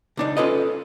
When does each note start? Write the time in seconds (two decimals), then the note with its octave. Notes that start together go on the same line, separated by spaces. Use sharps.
0.17 C#2 D4 D#4
0.37 C#4 F4 A4 B4 D#5